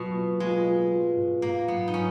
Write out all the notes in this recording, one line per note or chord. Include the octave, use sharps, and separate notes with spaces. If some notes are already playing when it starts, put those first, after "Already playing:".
Already playing: B2 F#3 F4
A#3
G#3 F4
F4
F4
G#2
G#2 A#3
F#3 B3
D#4
F#3 C#4